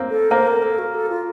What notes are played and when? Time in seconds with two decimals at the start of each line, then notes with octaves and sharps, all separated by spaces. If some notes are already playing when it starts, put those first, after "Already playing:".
Already playing: A#3 C4
0.10 A4
0.31 A#3 C5
0.47 A#4
0.62 A4
0.78 F#4
0.95 A4
1.10 F4